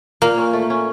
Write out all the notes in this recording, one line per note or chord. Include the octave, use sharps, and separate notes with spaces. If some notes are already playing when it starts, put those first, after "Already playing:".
A#2 A#3
C#4
A3
C#4